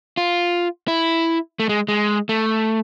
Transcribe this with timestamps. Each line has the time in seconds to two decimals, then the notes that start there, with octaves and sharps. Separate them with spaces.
0.17 F4
0.88 E4
1.60 A3
1.69 G#3
1.88 G#3
2.29 A3